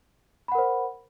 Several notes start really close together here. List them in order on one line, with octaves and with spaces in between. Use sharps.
B5 F#5 A#4 C5